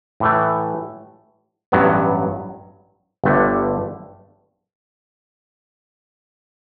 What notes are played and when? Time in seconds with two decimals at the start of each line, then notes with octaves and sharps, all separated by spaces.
0.20 A2 E3 A3
1.72 A1 G2 F#3 B3
3.24 G1 G2 D3 A3